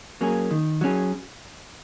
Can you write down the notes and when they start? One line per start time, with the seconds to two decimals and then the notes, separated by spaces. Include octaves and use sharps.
0.21 F#3 A#3 C#4 G#4
0.51 D#3
0.81 F#3 C#4 G#4